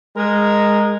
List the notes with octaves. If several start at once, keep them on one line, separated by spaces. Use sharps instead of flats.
G#3 A#4